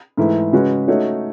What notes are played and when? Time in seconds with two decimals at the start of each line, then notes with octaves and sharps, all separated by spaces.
0.17 G#2 E3 A3 E4
0.52 C#3 G#3 C#4 F#4 B4
0.88 A3 D#4 F#4 C#5